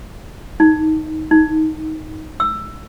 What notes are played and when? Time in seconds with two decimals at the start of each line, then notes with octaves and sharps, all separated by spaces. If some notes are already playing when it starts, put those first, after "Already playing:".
0.60 D#4
1.31 D#4
2.40 E6